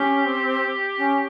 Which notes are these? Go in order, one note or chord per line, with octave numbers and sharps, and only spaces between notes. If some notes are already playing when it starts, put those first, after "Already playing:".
Already playing: C#4 G4
C4
C#4